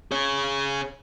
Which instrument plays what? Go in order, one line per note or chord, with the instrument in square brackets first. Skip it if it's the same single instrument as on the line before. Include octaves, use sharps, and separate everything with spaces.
[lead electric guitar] G#4 C#5